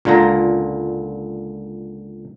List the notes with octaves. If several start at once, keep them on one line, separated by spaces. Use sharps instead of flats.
C#2 A#2 D3 F4 A#5